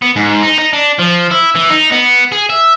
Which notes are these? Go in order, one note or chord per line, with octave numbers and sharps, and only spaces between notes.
B3
G#2
D#4
D#4
D4
F3
E4
E3
D#4
B3
G#4
E5